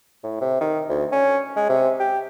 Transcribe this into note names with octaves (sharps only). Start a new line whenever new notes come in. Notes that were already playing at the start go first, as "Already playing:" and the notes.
A2
C3
D#3
D2
C#4
G#3
C3
G4